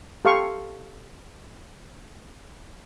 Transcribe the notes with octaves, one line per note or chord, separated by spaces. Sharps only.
G4 A4 F5 C6 C#6